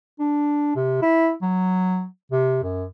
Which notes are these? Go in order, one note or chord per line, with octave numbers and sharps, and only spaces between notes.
D4
C3
E4
F#3
C3
F#2